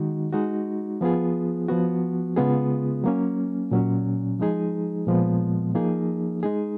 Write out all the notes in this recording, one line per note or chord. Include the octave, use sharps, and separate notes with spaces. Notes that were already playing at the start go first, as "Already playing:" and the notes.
Already playing: D#3 G#3 D#4 F#4
G#3 D#4 F#4
F3 B3 F4 G#4
F3 B3 F#4
C#3 G#3 B3 F4 G#4
F#3 A#3 C#4
A#2 F#3 C#4
F3 G#3 D#4 G#4
A#2 F3 G#3 B3
F3 A#3 D#4 G#4
G#3 D#4 G#4